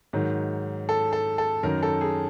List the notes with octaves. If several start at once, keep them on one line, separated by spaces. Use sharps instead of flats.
G#2 D#3 F#3
A4
A4
A4
F#2 D#3 F#3 A#4
A4
G#4